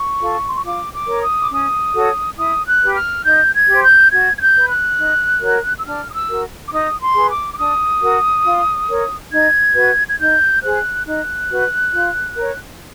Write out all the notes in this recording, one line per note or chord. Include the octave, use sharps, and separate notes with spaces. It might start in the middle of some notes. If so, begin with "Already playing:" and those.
Already playing: C#6
F4 A4
C6
C#6
F4 D6
D6
A#4 C#5
D#6
D6
C#4 D#6
F#4 A4 C#5
E4 D#6
F#6
G4 B4
F6
D#4 G6
G#6
G4 C5
G6
F#4 G#6
G#6
G6
B4
F#6
D#4
F#4 A#4 C#5
E6
D4 F6
D#6
E6
F#4 A#4
D6
D#4 D#6
C6
G#4 B4
D6
D6
D4 D#6
F#4 A#4
F4
A#4 C#5
D#4 G#6
F#4 B4
G#6
D#4 G6
G#4 C5 F#6
D#4 F#6
F#4 B4
F4
A#4 C#5